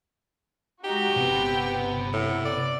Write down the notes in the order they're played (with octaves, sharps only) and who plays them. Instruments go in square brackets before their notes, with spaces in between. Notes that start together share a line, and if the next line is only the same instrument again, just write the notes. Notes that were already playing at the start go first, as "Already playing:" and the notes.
[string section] G#3 D#4 F#4 [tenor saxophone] G4
[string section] G1 B3 [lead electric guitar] C3
[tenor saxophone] A2
D5